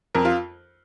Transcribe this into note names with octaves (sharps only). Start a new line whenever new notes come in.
F2 A#4
F4